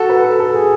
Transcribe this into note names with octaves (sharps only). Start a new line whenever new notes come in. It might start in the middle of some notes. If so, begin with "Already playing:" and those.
Already playing: F#4 A4
B4
A4
A4
G#4